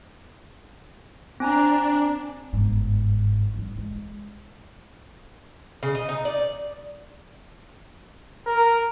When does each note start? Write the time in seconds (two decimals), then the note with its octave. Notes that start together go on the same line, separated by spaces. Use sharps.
1.40 C4 D4 G#5 A#5
2.53 G1 G#2
3.54 G3 A3
3.78 G#3
5.83 C#3
5.95 D#5
6.09 D#4
6.25 D5
8.47 A#4